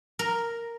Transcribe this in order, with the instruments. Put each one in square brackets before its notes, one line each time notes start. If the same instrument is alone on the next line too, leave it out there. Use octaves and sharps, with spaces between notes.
[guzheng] A#4